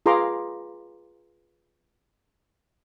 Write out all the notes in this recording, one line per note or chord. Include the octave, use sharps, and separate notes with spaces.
F4 G#4 B4 A#5 C6 D6